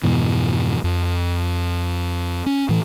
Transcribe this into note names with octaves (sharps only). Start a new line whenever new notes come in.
F2 G#2 B2 E3
F2
C#4
A2 E3